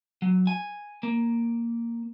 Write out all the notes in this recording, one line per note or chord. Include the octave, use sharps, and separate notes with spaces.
F#3
G#5
A#3